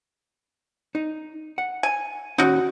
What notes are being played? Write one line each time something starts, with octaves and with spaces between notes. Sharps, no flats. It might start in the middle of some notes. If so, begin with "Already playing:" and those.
D#4
F#5
G#5
D#2 C#4 D#4 F#4